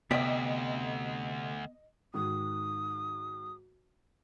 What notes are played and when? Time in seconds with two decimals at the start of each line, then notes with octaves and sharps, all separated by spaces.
0.11 D2 C3 B3 D5 D#5 B6
2.14 G#2 D#3 F#4 D#6